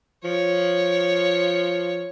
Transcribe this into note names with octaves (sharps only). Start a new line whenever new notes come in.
F3 C#5